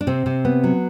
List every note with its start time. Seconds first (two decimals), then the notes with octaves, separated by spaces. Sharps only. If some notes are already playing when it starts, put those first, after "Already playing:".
0.01 D4
0.07 C3 C4
0.26 C3
0.45 B3
0.64 F#3